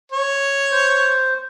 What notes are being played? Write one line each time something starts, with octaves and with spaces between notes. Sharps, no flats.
C#5
C5